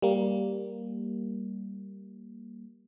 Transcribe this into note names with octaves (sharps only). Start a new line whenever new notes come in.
G3 A#3